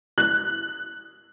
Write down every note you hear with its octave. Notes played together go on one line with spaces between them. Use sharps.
F#6